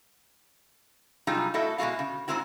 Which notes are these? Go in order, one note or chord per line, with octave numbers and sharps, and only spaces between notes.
C3 F#3 G3 D#4 F4 G#4
A3 E4 F#4 A4 D#5 E5
B2 G#3 B3 F#4 F5
C#3
G#2 C#3 G#3 C4 E4 F#4